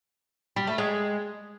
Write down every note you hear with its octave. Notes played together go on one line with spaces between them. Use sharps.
G3
A3
G#3